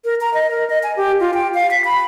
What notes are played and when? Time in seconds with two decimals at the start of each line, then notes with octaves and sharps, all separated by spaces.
0.05 A#4
0.21 A#5
0.34 D#5
0.51 A#4
0.70 D#5
0.83 G#5
0.97 G4
1.20 F4
1.34 G5
1.54 F5
1.71 B6
1.85 B5